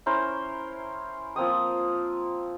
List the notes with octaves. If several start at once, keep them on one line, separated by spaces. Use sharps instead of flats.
C#4 E4 A#4 C5
F3 A#3 C4 D#6